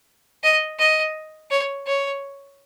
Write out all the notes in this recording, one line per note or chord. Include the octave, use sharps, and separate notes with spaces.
D#5
D#5
C#5
C#5